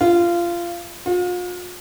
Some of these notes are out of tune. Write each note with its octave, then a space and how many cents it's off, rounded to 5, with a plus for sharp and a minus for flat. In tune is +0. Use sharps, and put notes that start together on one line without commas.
F4 -20
F4 +40